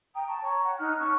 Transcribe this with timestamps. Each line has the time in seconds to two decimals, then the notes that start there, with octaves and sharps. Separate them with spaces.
0.14 G5 A#5 D#6
0.27 A5 C#6
0.43 C#5 A#5 C#6
0.63 F#5
0.79 D#4 F6 F#6
0.99 C#4 A5 C#6